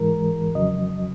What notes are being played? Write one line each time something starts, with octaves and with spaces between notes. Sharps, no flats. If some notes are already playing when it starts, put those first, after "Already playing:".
Already playing: G#2 E3 G#3 A#4
F2 C#3 F#3 D#5